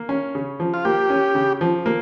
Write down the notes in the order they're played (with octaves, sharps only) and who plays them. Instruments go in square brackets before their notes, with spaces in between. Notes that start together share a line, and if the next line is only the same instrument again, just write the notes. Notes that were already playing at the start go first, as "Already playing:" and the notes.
Already playing: [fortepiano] A#3
C#4
C#3
F3
[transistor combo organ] F4
[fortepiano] A#3 [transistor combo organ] G4
[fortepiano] C#4
C#3
F3
A#3